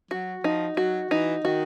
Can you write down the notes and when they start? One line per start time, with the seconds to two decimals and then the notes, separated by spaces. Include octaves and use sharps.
0.11 F#3 F#4
0.44 F3 D#4
0.77 F#3 F#4
1.11 E3 D#4
1.44 D#3 F#4